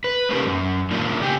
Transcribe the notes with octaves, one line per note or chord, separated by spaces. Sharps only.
B4
A#3 C#4 D#4 G4 A#4 B4
F#2
A#3 D4 D#4 F4 A#4
C#3 G4 G5 G#5